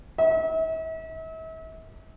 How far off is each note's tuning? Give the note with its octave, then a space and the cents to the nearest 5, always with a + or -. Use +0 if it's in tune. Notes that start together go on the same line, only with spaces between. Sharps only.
E5 -40